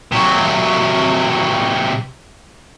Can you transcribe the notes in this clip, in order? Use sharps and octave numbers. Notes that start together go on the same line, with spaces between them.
C3 F#3